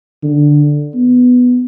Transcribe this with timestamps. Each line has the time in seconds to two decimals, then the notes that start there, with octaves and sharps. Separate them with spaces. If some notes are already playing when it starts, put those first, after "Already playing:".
0.23 D3
0.95 B3